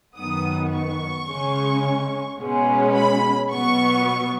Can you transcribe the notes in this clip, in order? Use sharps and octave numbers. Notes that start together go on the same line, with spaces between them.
F#2 D#3 F#3 B3 D#6
C#6
C#3 G#3 C#4
B2 G#3 C#4
B5
B2 F#3 B3 C#6